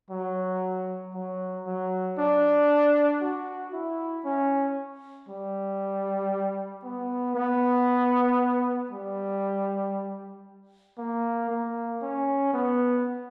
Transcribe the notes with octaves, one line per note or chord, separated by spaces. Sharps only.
F#3
F#3
F#3
D4
F#4
E4
C#4
G3
B3
B3
G3
A#3
A#3
C#4
B3